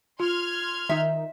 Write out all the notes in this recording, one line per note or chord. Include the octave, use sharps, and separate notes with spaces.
F4 C6 F6 G#6
D#3 D#4 E5